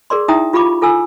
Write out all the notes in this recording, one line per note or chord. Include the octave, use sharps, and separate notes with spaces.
G#4 A#4 D5 C6
D#4 E4 E5 G5 A#5 D#6
F4 G4 F5 B5 C#6 D6
F4 A4 G#5 E6